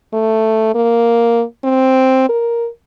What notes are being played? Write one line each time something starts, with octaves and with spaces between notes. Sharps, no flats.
A3
A#3
C4
A#4